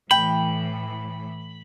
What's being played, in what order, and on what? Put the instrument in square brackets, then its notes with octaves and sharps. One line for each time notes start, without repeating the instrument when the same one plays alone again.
[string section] A2 E3 [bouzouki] G5 [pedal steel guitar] B5